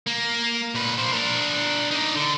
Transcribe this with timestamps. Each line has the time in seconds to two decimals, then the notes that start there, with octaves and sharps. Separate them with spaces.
0.07 A#3
0.75 A#2 B4
0.98 A#3 C5
1.12 D4 A#4
1.91 D#4 D5
2.15 D3